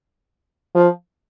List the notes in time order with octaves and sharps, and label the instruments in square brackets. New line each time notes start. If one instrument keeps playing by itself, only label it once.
[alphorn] F3